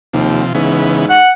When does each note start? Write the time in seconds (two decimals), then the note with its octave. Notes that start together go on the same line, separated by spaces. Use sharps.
0.13 D#2 C3 F3
0.54 G#2 C#3 E3 B3
1.09 F#5